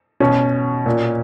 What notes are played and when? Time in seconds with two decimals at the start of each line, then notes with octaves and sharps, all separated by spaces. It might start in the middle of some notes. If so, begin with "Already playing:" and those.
0.20 B2 C#4
0.86 A#2